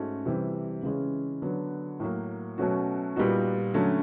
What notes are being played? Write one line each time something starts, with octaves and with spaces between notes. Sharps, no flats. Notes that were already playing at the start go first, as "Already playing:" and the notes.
Already playing: G#2 A3 C#4 F#4
C3 E3 G3
C#3 E3 G#3 C#4
D3 F#3 B3 D4
A2 F#3 A#3
B2 F#3 A3 C#4 F#4
A#2 G3 B3 D#4 F#4
D3 F#3 A3 C#4